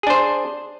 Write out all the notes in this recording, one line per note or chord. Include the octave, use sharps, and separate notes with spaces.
D4 G#4 C5